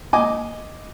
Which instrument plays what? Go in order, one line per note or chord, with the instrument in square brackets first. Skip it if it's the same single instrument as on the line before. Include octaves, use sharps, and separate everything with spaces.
[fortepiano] D#5 G#5 D6